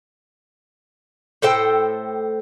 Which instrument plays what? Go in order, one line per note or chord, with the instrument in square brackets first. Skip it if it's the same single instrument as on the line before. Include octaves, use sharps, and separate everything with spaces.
[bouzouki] A2 A4 C5 G5